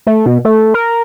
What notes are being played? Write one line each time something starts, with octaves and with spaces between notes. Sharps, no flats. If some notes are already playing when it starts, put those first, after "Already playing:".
A3
B2
A3
A#4